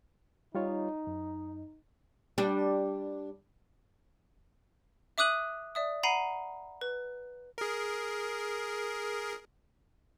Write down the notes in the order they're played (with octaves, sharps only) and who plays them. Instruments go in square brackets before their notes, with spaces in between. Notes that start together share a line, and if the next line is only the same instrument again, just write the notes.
[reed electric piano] G3 F4 C#5 [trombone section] D#4
[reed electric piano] F#2
[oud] G3 D4
[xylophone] E5 D6 D#6 F#6 D#7 F#7
D5 E5 D#6
F#5 A#5 B5 C7 D#7
B4
[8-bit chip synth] G#4 A#4